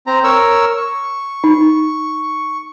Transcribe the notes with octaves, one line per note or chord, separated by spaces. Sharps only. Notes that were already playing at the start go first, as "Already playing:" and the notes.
C4 A#5
A#4 C#5 E6
C#6
D#4